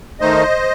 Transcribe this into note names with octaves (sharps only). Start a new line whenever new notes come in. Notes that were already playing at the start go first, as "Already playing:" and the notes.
D#3 A3 D#4 C5 D#5